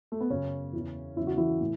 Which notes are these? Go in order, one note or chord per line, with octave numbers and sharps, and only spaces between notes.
A3
B3
F#2 C#3 F#3 C#4
E2 E3
E2 C#3 F#3 E4
F#4
E3 E4
A2